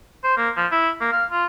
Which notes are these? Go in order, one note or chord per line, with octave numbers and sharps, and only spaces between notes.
C5
A#3
F3
E4
A#3
F5
F4